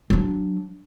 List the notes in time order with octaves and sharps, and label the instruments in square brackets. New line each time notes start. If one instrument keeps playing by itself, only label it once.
[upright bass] F#3 D4